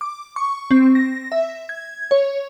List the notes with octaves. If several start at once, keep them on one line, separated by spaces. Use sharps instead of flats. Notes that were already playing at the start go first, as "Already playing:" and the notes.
D6
C#6
C4
A#6
E5
G#6
C#5